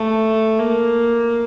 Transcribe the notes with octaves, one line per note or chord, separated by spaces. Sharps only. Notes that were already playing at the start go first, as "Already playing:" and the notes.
Already playing: A3
A#3